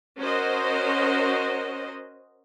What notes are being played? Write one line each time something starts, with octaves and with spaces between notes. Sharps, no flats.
C#4 F#4 A#4 C5 D#5